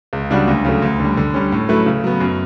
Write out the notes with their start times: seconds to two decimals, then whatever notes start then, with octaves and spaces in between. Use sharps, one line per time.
0.13 C#2
0.31 C#3 G3 D4 F#4
0.47 D2
0.65 C#3 F#3 A3
0.82 D2
1.00 D3 G3
1.17 D3
1.34 G3 C#4
1.52 A2
1.69 F#3 A3 E4 B4
1.86 C#3
2.04 F#3 B3
2.20 F#2